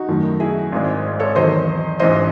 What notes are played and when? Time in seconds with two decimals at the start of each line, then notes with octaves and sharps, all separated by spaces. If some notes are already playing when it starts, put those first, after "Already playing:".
Already playing: D#4 F#4
0.08 F#2 D#3 F#3 A3
0.40 E4 G#4
0.72 G#1 G#2 D#3 G#3
1.20 A4 C#5
1.35 E2 D#3 F#3 C5 D#5
1.99 A1 G#2 E3 C5 D#5